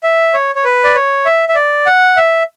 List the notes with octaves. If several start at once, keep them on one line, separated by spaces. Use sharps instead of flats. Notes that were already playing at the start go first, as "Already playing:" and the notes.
E5
C#5
C#5
B4
D5
C#5
E5
E5
D5
F#5
E5